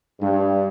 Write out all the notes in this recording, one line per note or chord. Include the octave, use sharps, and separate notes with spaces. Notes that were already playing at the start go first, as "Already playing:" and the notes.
G2